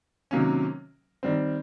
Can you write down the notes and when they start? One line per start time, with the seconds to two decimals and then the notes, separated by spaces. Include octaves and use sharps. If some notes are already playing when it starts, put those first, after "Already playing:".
0.31 C3 D#3 F#3 A#3 C#4
1.23 D#3 G3 C4